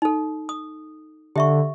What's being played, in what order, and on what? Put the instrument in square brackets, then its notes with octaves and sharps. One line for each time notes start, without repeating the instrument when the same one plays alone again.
[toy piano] D#4 A4
D#6
[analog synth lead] D3 [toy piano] G4 E5 C#6